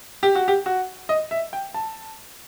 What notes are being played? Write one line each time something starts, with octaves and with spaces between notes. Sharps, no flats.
G4
F#4
G4
F#4
D#5
E5
G5
A5